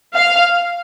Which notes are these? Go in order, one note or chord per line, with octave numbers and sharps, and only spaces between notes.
F5